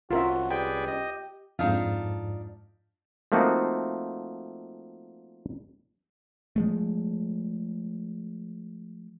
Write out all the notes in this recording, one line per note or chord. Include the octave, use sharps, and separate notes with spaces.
C2 C#4 F4 F#4 A#4 E5
G4 G#4 B4 D5 G5
D#5
F2 G#2 D4 D#4 F4
F3 A3 A#3 C4 D#4 F#4
F3 G#3 A3